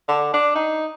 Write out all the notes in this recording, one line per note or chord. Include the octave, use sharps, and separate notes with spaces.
D3
D4
D#4